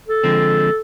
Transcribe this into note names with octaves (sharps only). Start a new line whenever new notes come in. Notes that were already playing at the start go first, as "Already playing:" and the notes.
A4
D3 F3 G#3 C4